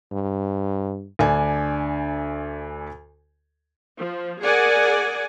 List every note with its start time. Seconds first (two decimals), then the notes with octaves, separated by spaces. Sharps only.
0.12 G2
1.19 D2 D4 G#5
3.99 F3
4.42 G#4 A#4 D5 F#5 G#5